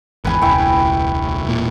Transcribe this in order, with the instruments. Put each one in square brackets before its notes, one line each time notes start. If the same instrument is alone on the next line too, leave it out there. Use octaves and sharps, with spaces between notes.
[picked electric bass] G#1 E2 [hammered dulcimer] B4 G#5
[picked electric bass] E1 C#2 [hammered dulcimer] E4 G5 C#6
[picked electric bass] E1 A#2